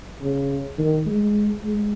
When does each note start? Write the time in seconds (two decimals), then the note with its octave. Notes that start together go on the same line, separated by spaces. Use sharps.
0.22 C#3
0.78 D#3
1.06 G#3
1.64 G#3